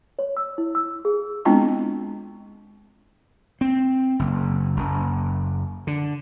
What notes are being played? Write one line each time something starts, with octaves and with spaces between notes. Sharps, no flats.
C#5
E6
E4
E6
G#4
G#3 B3 C4 D4 E4 F4
C4
F#1
F#1
D3